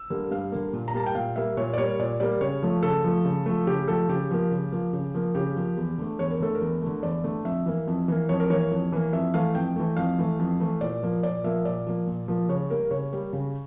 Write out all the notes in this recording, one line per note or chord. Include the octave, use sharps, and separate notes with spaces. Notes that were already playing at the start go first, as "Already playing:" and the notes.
Already playing: E6
D3 G3 A#3
G2 F5
D3 G3 A#3
A#2
A#5
G3 A#3 A5
G5
A#2 F5
G3 A#3 E5
A#2 C#5
D5
G3 A#3 C#5
A#2 D5
G3 A#3 D5
C#3 C#5
F3 A3
C#3 A4
F3 A3
C#3
F3 A3
C#3 G4
F3 A3 A4
C#3 G4
F3 A#3
C#3
F3 A#3
C#3
F3 A#3
C#3 G4
F3 A#3
E2
D3 A3
E2 C#5
A#4
D3 A3 A4
A#4
E2
D3 A3
E2 D5
D3 A3
F2 E5
E3 A#3
F2
E3 A#3
F2 C#5
A#4
E3 A#3 C#5
F2
E3 A#3
F2 E5
E3 A3 F5
F2 G5
E3 A3
F2 F5
E3 A3
F2
E3 A3
A#2 D5
F3 A#3
A#2 D5
F3 A#3 E5
A#2 D5
F3 A#3
A#2
F3 A#3
C#3 C#5
G3 A#3 A#4
C#3 C#5
G3 A#3
C#3